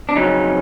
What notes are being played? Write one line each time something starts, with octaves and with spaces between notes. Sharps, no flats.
D4
F2 C#3 F#3 C#4 D#4